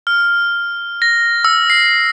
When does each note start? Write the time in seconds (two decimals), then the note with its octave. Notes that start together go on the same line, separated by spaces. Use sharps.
0.07 F6
1.02 A#6
1.45 E6
1.70 C7